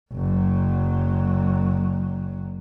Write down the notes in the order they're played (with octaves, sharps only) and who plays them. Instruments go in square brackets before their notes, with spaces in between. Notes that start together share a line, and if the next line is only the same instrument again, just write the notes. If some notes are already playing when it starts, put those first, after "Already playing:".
[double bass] F#1 F#3